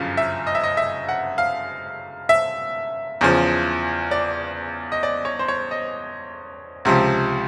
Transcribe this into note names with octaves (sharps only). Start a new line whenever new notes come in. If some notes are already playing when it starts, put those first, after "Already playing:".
Already playing: G1 F#2 C#3 F3 F5
E5
D#5
E5
D#5
E5
F#5
F5
E5
E2 C#3 F3
D5
D#5
D5
C#5
C5
C#5
D#5
C#2 C3 F3